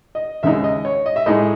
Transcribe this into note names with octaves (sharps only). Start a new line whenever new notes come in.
D#5
D#2 C#3 G#3 D#4 E5
D#5
C#5
D#5
E5
A2 G#3 D#4 D#5